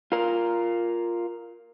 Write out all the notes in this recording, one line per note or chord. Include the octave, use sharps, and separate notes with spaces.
F4 A#4